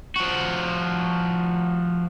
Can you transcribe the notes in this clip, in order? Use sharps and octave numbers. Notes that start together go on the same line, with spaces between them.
F3 F#4